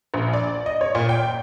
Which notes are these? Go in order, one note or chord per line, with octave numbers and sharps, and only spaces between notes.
A#1
D5
D#5
C#5
A#2
G5